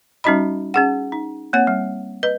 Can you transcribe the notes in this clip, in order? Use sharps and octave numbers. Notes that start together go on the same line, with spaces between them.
G3 C#4 D#4 F#4 D#5 B5
C#4 G#4 F#5
D#4
A#3 C4 C#5 F#5
G3
B4 D#5